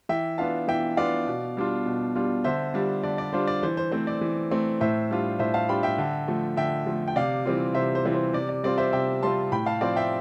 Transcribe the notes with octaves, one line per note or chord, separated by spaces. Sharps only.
E3 E5 G5
B3 D4 F4 F5 A5
E3 E5 G5
B3 D4 F4 D5 F5
B2
G3 D4 F4
B2
G3 D4 F4
D3 C5 E5
G3 D4 F4
D3 D5
D5
G3 D4 F4 C5
D5
E3 C5
C5
A3 C4 C5
D5
E3
A3 C4
A2 C5 E5
G3 D4 F4
A2 C5 E5
F5 A5
G3 D4 F4 G5 B5
E5 G5
D3
F3 A3
D3 E5 G5
F3 A3
G5
C3 D5 F5
E3 G3 C4 F4
C3 C5 E5
C5
E3 G3 C4 F4
C5
C3 D5
D5
G3 C4 F4 D5
C5 E5
C3 E5 G5
G3 C4 F4 A5 C6
A2 G5 B5
F5 A5
F3 C4 D5 F5
E5 G5